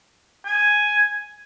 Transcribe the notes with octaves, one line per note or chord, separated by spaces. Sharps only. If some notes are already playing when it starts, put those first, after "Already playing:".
G#5